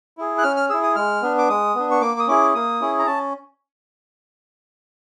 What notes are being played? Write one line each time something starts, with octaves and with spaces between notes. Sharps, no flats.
E4 G#4
F#6
C#4 F6
F6
E4 G#4 E6
D#6
G#3 F6
B3 D4
D6
G#3 D#6
B3 D4
C#6
A#3 D6
D#6
C#4 E4 G#4 D6
A#3 D#6
C#4 E4 G#4
A#5
C#4 A5